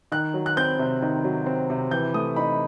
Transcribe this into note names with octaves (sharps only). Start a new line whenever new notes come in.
D#3 F#6
F#3
F#6
C4 G6
C3
D#3
F#3
C4
C3
E3 G6
A3 D#6
D#4 B5